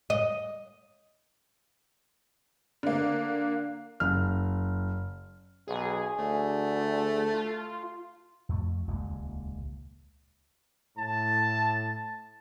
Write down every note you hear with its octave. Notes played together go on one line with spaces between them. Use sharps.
D#5
D3 A#3
F#1 F6
B1 G#4
D2 A3
F4
F2 A3
D#1 C#2 G#3 A#3
A2 A5